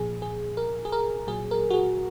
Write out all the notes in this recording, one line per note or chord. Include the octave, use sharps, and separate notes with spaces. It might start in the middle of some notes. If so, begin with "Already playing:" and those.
Already playing: A#2 F3 G#4
G#4
A#4
G#4
A#4
A#2 F#3 G#4
A#4
F#4
G#4